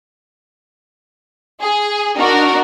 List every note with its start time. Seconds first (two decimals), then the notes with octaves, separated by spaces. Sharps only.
1.61 G#4
2.16 D4 D#4 F#4 A#4